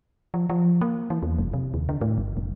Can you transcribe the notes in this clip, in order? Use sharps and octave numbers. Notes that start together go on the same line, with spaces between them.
F3
F3
A#3
E3
E2
F1
C3
D#2
D3
A2
G1
F#1